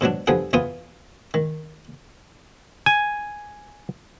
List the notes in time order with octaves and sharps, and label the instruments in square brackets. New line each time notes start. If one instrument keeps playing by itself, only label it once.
[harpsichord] G#2 B2 F#3 D4
D3 F3 G3 B3 G#4
E2 E3 B3 F4 D#6
D#3
[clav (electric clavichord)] G#5